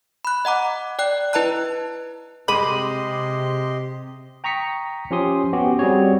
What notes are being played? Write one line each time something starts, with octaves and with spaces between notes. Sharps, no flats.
B5 F#6
D#5 F#5 A#5 D6
D5 G5 F#6
E4 B4 D#5 A5 A#5 F#6
C3 G#3 G4 D#5 B5 C6 D6 D#7
G5 A#5 C#6 D#6 B6 C#7
F3 C#4 F4 G4 C6 D#6
B3 C#4 F#4 G4
G3 C4 F#4 G#4 C#5